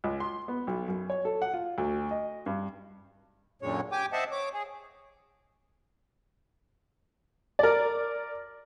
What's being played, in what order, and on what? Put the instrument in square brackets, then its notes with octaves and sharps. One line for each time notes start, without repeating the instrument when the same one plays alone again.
[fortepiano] C#2
C6
B3
B1
F#2
C#5
A4
F#5
F4
D2
D#5
G2
[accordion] F#2 A#2 D3 G#3 C#5
G4 G5 G#5 D6
C5 D#5 E5 F#5 A5
C#5 D6
G#4
[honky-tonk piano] A#4 D5